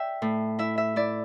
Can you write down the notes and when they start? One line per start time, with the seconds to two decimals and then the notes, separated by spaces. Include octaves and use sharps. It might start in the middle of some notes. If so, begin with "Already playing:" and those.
Already playing: D5 E5 G5
0.22 A2
0.59 E4 E5
0.78 E5
0.96 E4 D5